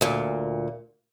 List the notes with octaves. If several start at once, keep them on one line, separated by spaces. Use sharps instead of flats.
D2 A#2